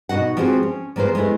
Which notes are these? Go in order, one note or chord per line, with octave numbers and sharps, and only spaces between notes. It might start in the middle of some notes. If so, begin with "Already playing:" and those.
B2 D#4 F#4 D#5 F#5
F3 G#3 C4 F#4 G#4 C5
C#4
F3 A#3 B3 G#4 C5
G#3 A3 B3 E4 G#4